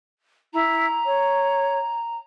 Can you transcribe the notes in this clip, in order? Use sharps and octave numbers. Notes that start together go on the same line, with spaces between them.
E4 A#5
C#5